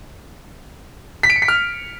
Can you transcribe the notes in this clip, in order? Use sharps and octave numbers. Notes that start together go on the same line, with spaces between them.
B6
D7
C#7
B6
F6